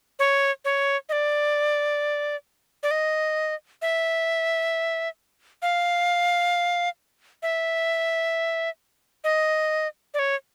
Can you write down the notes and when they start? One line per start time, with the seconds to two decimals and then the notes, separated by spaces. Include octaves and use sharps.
0.19 C#5
0.65 C#5
1.09 D#5
1.12 D5
2.83 D5
2.91 D#5
3.82 E5
5.62 F5
7.43 E5
9.24 D#5
10.14 D5
10.19 C#5